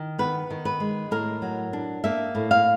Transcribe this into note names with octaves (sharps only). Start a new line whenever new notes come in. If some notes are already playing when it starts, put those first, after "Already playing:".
Already playing: D#3
B3 B4
D#3
B4
G#3
A2 A#4
F#3
D4
A#3 E5
A2
F5